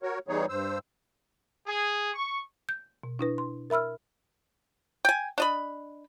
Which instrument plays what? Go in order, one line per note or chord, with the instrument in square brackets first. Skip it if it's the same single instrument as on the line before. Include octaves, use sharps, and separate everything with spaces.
[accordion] F#4 A#4 C#5
E3 G3 B3 D#4 G#4 C#5
G2 C5 E6
[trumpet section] G#4
C#6
[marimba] G6
B2
D4 E4 B4
C6
A#4 E5 B5 E6 F6
[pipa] G5 G#5
D4 D#5 B5